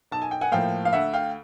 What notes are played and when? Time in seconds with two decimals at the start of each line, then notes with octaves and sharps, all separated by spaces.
0.11 B1 A5
0.22 G#5
0.31 G5
0.41 F#5 G#5
0.52 A2 F3 A#3 F5 G5
0.85 F5
0.93 D2 E5 F#5
1.13 F5 G5